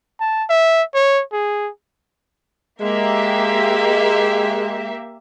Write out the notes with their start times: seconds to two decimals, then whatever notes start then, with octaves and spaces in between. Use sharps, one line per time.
0.20 A5
0.50 E5
0.94 C#5
1.32 G#4
2.81 G#3 A#3 G4 E5